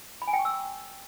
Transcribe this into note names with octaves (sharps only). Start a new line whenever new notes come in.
B5
G#5
G5
C#6
E6